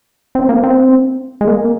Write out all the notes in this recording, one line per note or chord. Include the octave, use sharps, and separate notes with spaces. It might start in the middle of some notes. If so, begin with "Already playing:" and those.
C4
A#3
C4
G#3
A#3